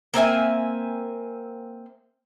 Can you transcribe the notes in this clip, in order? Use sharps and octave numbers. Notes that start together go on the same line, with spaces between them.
A#3 C4 E5 G#5